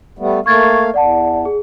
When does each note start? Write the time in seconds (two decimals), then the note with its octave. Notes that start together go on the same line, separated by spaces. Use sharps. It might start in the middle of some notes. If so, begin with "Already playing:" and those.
0.19 G3 A3 B3
0.46 A3 A#3 F5 C#6 G#6 A6
0.94 E2 D5 F#5 A5
1.45 G#4